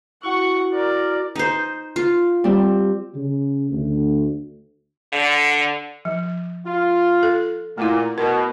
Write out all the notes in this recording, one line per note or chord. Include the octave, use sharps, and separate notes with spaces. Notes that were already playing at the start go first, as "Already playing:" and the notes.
E4 F#4 F#5 C#6
A#4 D5
D#4 C5
F4
G3 C4
C#3
D2
D3
F3
F4
A4
A#2 A3 E4
B2 A#4